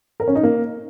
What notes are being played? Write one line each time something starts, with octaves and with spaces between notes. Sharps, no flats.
A#4
C#4
D#4
A#3